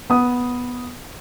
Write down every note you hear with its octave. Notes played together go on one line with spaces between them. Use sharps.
B3 D#6